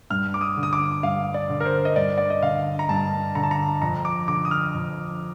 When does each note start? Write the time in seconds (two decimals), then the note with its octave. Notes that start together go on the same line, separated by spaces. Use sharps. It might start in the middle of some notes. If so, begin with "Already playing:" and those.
0.10 G2 F6
0.34 D6
0.41 D#6
0.57 D3
0.63 D#6
0.73 D6
1.03 G2 F5
1.34 D5
1.49 D3
1.60 A#4
1.65 C5
1.85 D#5
1.96 G2 D5
2.18 D5
2.30 D#5
2.42 D3 F5
2.79 A#5
2.89 G2 A5
3.35 D3 A#5
3.43 A5
3.51 A#5
3.82 F2 A#5
4.05 D6
4.28 D3 D6
4.45 D#6
4.51 F6
4.74 F2